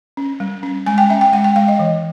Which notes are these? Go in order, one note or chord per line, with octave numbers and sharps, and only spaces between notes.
C#4
G3
C#4
G#3 G#5
G5
C#4 E5
G5
G#3 F#5
G5
G#3 F5
D#5
E3